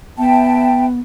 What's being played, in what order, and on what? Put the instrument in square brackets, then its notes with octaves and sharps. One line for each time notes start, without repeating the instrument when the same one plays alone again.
[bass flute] B3 [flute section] E5 G5 A5